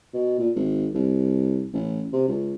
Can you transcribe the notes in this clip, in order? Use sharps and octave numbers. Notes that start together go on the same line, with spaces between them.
B2
A#2
G#1
C2
A1
C3
C#2